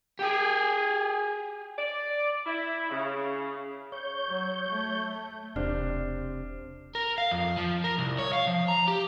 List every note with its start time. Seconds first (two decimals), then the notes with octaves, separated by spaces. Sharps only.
0.19 G4 G#4
1.78 D5
2.46 E4
2.90 C#3
3.92 C#5 G6
4.27 F#3
4.69 A3
5.56 E1 C3 D4 C5 F6
6.95 A#4
7.18 F5
7.31 F2
7.57 F3
7.84 A#4
7.98 C2
8.18 C#5
8.33 F5
8.47 F3
8.68 A#5
8.88 G4